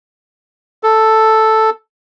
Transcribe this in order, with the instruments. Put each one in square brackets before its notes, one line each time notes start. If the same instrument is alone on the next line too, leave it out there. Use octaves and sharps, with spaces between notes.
[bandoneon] A4